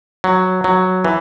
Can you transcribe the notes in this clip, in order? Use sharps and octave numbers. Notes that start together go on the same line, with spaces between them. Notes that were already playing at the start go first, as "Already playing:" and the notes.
F#3
F#3
E3